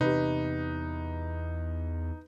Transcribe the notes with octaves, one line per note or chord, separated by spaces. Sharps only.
E2 C3 C4 D#4 G4 B4